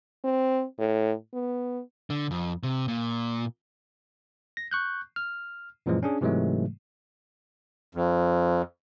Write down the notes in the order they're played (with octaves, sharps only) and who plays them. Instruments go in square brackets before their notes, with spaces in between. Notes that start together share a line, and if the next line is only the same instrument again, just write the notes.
[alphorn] C4
A2
B3
[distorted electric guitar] D3
F2
C3
A#2
[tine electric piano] A#6
C#6 F#6 G6
F6
F#2 A#2 E3 F3 G#3
C#4 D4 G#4
G#2 C3 E3 F#3 G#3 A3
[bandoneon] F2